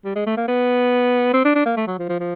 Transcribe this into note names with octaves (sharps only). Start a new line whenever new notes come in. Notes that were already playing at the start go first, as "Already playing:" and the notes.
G3
G#3
A3
A#3
B3
C4
D4
D4
A#3
A3
F#3
F3
F3
F3